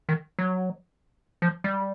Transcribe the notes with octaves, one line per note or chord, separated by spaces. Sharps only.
D#3
F#3
F3
G3